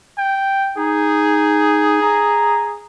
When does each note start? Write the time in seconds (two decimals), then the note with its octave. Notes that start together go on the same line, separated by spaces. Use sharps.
0.18 G5
0.77 D#4 G#4
2.02 A#5